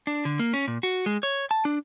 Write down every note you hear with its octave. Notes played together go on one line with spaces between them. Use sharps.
D4
D3
A#3
C#4
A#2
F#4
G#3
C#5
A5
D4